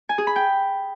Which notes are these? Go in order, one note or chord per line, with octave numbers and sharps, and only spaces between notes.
G#5
G#4
B5
G5